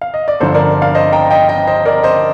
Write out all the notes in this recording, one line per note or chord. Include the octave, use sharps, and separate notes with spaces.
F5
D#5
D5
G1 G2 D3 F3 A4 C5
A#4 D5
D5 F5
C5 D#5
G5 A#5
D#5 G5
D#5 G5
C5 D#5
A#4 D5
C5 D#5